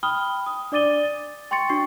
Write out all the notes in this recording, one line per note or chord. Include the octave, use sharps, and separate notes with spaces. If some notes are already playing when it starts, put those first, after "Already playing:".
G5 B5 D#6 F6 G7
D#6
D4 D5 D6 A6 D#7 G7
A6
G5 C6 C#6 A6 C#7
D4 F#4 C#6 C7